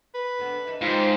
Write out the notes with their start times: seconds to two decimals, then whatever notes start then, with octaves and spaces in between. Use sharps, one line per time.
0.15 B4
0.39 D3 B3 D4
0.67 E3 D#4 A4
0.81 G#2 D#3 G3 C4 F4